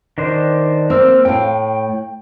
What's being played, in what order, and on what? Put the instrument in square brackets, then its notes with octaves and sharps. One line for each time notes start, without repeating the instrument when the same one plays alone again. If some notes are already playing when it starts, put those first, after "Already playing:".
[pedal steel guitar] D#3 D4 C5
[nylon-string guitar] A#3 C4 [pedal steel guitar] A#4 E6
[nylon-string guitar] A2 F5 [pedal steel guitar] G5